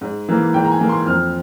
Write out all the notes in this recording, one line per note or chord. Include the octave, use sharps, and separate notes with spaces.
G#2
E3 A#3
G#2 G5
A#5
G#5
E3 A#3
C6
F2 F6